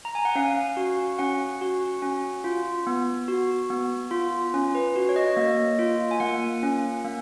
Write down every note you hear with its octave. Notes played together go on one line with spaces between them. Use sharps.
A#5
G#5
F#5
C#4 F5
F#4
C#4 F#5
F#4
C#4
F4
B3
F#4
B3
F4
C#4
B4
F#4
C#5
D#5
A#3
F4
G#5
A#3 F#5
C#4
A#3